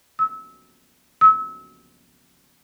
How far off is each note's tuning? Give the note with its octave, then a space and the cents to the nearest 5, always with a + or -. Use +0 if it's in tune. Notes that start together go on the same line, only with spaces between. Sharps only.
E6 -25
E6 -30